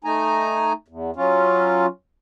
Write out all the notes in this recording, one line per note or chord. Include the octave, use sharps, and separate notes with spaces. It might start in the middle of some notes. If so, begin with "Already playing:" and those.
A3 D#4 G#5 A#5
E2
F#3 C#4 F4